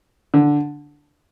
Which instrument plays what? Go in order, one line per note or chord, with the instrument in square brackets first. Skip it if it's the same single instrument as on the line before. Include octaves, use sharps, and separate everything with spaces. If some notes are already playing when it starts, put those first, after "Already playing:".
[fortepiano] D3